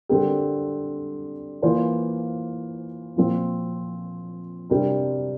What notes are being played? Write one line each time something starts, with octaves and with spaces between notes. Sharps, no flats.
D3 G3 C4 G4 A#4
E3 A#3 F4 C5
A#2 F3 C4
C3 G3 D4 G4 A#4